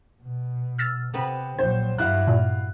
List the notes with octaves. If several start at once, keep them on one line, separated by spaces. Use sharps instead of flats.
B2
E6 F6 A6
C3 B3 C4 B4
A#1 F#3 C5 G6
G2 F#3 E4 F5 F#6
A#2